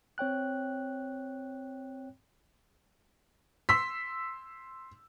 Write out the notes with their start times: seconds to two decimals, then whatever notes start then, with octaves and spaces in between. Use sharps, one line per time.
0.18 C4 C#5 G5 F#6
3.69 C6 E6 B6